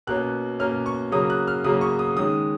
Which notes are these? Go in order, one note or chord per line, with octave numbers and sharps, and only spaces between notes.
B2 A#3 C#4 F#6
B2 A#3 C#4 F6
C#6
C#3 F#3 A#3 C#4 D#6
F#6
F6
C#3 F#3 A#3 C#4 D#6
C#6
D#6
D#3 G#3 C#4 D#6